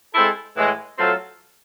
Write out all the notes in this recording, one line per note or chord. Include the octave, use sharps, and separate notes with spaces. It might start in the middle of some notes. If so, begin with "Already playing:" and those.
G#3 C4 E4 A4
A2 E3 G#3
F#3 A3 C4 F4 A4